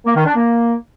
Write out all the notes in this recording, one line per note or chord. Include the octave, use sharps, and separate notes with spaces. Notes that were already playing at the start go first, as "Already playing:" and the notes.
A#3
D#3
D4
A#3